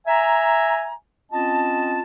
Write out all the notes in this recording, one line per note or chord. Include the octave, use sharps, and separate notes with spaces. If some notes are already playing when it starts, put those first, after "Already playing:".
E5 G#5 A#5
C4 C#4 F4 D#5 A5